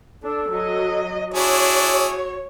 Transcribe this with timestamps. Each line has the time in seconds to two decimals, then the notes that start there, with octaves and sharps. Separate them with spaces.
0.23 D4 A4
0.52 F#3 D#5
1.34 D4 E4 F#4 G#4 C#5